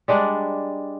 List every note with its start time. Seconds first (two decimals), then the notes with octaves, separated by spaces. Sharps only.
0.08 G3 G#3 D4